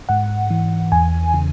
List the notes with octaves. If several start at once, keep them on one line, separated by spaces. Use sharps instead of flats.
G#2 F#5
E3
E2 G#5
C#3